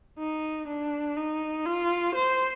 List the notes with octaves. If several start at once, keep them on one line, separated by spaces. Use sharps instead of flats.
D#4
D4
D#4
F4
C5